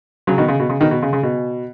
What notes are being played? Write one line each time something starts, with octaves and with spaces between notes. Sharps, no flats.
C#3 F#3
B2 D#3
C#3
B2
C#3
B2 D#3
B2
C#3
C#3
B2